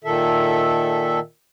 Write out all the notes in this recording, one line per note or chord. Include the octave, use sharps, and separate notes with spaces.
A#2 D#3 A4 E5